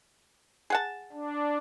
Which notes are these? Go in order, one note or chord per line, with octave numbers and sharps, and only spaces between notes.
G#4 F#5 A5
D4